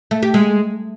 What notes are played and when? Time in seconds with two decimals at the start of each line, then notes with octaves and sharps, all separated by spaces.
0.11 A3
0.23 G4
0.34 G#3